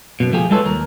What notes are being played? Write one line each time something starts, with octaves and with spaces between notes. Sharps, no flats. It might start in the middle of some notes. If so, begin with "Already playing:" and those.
F#2 B2
F3 A3 G4 G#4
G3 G#3 F4 A4 B4 C#5
D#2 A#4